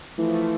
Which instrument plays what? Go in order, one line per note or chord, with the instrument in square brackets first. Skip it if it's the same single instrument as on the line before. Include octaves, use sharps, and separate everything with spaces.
[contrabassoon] E3 [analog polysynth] F3 A3
[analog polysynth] F3 A3